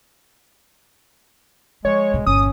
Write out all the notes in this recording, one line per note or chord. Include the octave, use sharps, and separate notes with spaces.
F3 G#3 C#5
E1 B2
G1 A#2 C#4 D#6